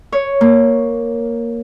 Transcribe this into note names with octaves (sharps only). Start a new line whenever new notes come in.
C#5
A#3